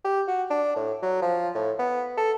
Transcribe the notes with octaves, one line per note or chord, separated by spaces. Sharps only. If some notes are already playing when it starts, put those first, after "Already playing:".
G4
F#4
D4
A2
F#3
F3
A2
B3
A4